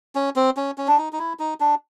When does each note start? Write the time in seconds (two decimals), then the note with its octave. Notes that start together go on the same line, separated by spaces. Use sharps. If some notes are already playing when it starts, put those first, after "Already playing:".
0.15 C#4
0.36 C4
0.57 C#4
0.78 C#4
0.88 D4
0.98 D#4
1.13 D#4
1.19 E4
1.39 D#4
1.60 D4